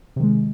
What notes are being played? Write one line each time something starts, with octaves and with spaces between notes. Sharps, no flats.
C3 D#3 G#3